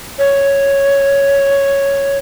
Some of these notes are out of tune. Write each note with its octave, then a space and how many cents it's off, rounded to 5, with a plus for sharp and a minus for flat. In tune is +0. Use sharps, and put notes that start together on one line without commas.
C#5 +0